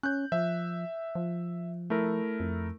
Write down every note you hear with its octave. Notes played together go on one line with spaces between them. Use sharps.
C#4 F#6 G6
F3 E5
F3
A3 E4 A#4
F2